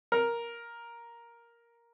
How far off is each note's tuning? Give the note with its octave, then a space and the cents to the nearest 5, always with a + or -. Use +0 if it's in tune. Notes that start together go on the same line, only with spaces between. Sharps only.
A#4 +5